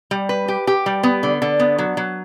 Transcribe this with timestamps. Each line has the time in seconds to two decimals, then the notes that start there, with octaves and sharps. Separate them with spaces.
0.11 G3
0.29 B4
0.48 G4
0.67 G4
0.86 G3
1.03 B3
1.23 D3
1.42 D3
1.60 B3
1.78 F#3
1.97 F#3